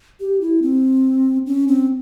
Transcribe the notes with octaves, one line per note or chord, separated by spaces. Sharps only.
G4
E4
C4
C#4
C4